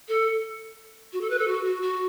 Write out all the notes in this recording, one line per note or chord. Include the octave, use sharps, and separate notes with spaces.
A4
F#4
A4
B4
A4
F#4
F#4
F#4